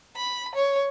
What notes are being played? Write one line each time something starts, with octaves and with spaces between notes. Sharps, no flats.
B5
C#5